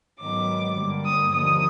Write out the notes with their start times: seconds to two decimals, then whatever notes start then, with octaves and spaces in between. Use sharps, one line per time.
0.20 G#2 D#3 F#3 B3 D6
0.76 G2 D3 G3 A#3
1.05 D#6
1.32 D#2 D3 F3 A#3 D#6